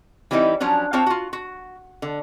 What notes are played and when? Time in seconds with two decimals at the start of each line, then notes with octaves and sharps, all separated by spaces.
0.31 E3 G3 C4 D#4 E4
0.60 F3 F#3 C#4 D4
0.93 C4 D4 F4 C5 C#5
1.06 F4 F#4
1.33 F#4
2.02 D3